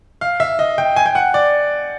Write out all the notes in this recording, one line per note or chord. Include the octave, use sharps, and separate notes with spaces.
F5
E5
D#5
G5
G#5
G5
F#5
D5